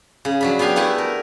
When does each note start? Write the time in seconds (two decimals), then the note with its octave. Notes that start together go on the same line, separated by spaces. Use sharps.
0.25 C#3
0.41 F#3 D4 B5
0.59 B3 D4 G4 F5 G#5
0.76 A3 E4 G4 F#5 G#5
0.98 A#4